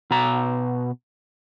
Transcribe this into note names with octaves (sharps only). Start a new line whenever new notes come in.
B2 A#5